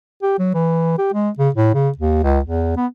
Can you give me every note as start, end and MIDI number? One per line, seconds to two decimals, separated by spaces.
0.23 0.35 67
0.39 0.51 54
0.54 0.97 52
0.98 1.10 67
1.14 1.30 56
1.39 1.49 49
1.55 1.71 45
1.74 1.89 49
1.98 2.19 39
2.24 2.39 37
2.45 2.75 40
2.77 2.86 59